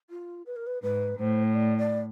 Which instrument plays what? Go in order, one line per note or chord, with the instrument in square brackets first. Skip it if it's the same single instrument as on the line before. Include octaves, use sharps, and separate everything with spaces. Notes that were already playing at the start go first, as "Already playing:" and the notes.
[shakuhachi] F4
B4
A#4
B4
[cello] G#2 [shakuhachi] B4
[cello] A2 [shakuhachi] C5
[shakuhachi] C#5
D5
D5